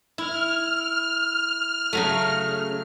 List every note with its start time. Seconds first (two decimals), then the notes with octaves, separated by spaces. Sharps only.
0.18 E4 F6
1.93 C#3 F#3 A3